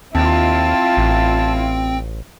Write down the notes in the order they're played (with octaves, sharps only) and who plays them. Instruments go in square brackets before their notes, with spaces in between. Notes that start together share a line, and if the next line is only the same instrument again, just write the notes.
[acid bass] D#2 [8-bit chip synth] C4 G5 [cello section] E4 F4 [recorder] A5
[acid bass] A1